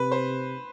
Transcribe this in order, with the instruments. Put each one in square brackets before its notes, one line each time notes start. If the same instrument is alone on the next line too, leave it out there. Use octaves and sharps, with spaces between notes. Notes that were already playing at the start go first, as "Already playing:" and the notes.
Already playing: [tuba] C3 [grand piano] B4
[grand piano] C5